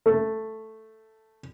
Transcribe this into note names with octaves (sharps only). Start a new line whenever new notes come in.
A3